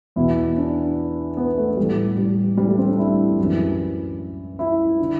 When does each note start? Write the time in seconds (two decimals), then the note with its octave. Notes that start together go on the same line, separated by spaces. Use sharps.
0.16 E2 B2 E4
0.57 D4
1.37 B3
1.58 A3
1.68 B3
1.77 A2 E3 G3
2.17 G3
2.57 G3
2.68 A3
2.78 C4
2.88 D4
2.98 E4
3.38 F#2 E3
4.59 E4
5.00 D3